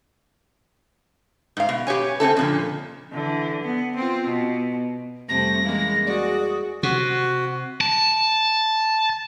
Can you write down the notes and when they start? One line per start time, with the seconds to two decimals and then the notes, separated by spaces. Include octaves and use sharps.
1.57 G#2 F5
1.69 B2
1.87 G4 B4 C#5 G#5
2.20 C4 C#4 D#4 A4
2.37 F2 A#2 D3
3.12 D3 E3
3.63 B3
3.96 C4 F4
4.27 B2
5.29 F2 C3 G3 A3 A5 A#6
5.65 E3 G#3 A#3 C#4 F5
6.06 F#4 G#4 D5
6.83 C3 F#4
7.81 A5